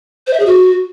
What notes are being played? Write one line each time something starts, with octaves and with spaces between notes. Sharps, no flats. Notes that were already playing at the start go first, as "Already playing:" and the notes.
C5
E5
G#4
F#4